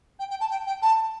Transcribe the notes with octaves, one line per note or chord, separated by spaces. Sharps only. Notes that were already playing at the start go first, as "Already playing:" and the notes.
G5
G5
A5
G5
G5
A5